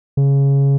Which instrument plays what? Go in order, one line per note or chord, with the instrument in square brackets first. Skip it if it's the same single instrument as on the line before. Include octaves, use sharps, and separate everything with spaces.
[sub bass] C#3